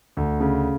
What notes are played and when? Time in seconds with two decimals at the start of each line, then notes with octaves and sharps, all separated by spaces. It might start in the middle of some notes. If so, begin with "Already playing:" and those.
0.17 D2
0.41 C#3